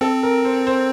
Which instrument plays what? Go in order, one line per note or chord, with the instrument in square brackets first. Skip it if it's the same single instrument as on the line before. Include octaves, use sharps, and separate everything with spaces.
[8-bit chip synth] C4 [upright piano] A4
[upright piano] A#4
C5
C5